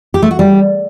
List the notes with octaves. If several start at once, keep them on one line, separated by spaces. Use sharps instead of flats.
G4
A3
F#4
G3